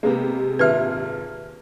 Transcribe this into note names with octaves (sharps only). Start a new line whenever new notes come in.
C3 G#3 A#3 B3 G4
G#1 A#2 B4 E5 F6